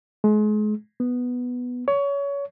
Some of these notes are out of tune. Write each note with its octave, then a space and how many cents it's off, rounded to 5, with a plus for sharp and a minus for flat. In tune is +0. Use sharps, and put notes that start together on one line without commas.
G#3 +35
B3 +0
C#5 +25